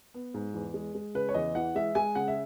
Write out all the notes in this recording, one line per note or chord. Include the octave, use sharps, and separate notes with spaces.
B3
G#2
E2
G#3
G#3
C#3 B4
C#5
E2 D#5
E3 F#5
G#3 E5
G#3 G#5
C#3 F#5
E5